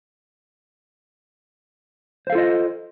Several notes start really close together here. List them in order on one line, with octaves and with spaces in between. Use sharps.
C5 F5 A4 F4 D#5